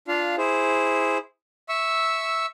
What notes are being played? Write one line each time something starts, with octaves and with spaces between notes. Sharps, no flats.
D4 F4 F5
E4 G#4 C5
E5 C#6 E6